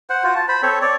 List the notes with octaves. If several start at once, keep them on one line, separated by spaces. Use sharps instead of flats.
C5 F#5
F4 F#4
A5
C5 B5
C4 A4 C#5
C#5 D5